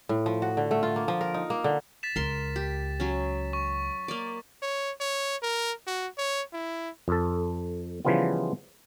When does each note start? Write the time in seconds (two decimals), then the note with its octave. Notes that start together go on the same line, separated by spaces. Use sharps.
0.09 A2
0.26 F3
0.42 F#4
0.57 D3
0.71 A3
0.83 F4
0.96 A#3
1.08 F3
1.21 A#4
1.34 D#4
1.50 A#3
1.64 D3
2.03 A6 B6 E7
2.16 C#2 A#4 C6
2.56 G4
3.00 F#3 C#4
3.53 C#6
4.08 A#3 D5
4.62 C#5
5.00 C#5
5.43 A#4
5.87 F#4
6.18 C#5
6.53 E4
7.08 F2 A4
8.05 C#3 E3 F3 G3 B3 F4